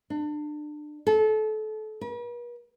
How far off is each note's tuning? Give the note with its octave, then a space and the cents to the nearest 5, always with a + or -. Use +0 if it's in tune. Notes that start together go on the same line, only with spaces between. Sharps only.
D4 +30
A4 -30
B4 -45